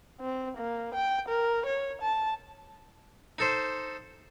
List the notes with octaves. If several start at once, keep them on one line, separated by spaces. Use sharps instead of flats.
C4
A#3
G5
A#4
C#5
A5
D#4 A4 C5